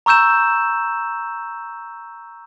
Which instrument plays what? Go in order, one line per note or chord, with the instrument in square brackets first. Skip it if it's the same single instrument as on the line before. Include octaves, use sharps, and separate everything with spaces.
[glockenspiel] A#5 C#6 E6 G6 E7